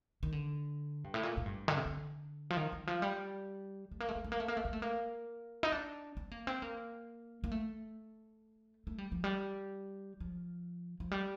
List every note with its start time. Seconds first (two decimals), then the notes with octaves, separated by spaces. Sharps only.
0.23 D#3
0.32 D3
1.04 G2
1.14 A2
1.23 A#2
1.37 A2
1.46 G2
1.68 D3
1.77 C3
1.86 D3
2.50 F3
2.57 D#3
2.72 D#3
2.87 F3
3.02 G3
3.91 A3
4.00 A#3
4.09 A3
4.16 A#3
4.24 A3
4.32 A#3
4.40 A3
4.48 A#3
4.57 A3
4.65 A#3
4.73 A3
4.82 A#3
5.63 D#4
5.72 D4
6.17 C4
6.31 A#3
6.47 C4
6.62 A#3
7.44 A#3
7.51 A3
8.87 A3
8.98 G3
9.12 F3
9.24 G3
10.20 F3
11.00 F3
11.11 G3